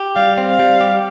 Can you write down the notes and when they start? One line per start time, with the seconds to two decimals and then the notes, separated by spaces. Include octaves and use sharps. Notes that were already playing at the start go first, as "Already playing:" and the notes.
Already playing: G4
0.16 G3 F5
0.38 C4
0.48 F5
0.59 G3
0.81 G4